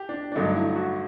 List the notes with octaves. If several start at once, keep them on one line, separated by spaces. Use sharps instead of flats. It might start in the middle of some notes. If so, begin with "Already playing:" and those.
Already playing: G4
D4
D4
G2 D3 F#3 A3 D#4
E4
F#4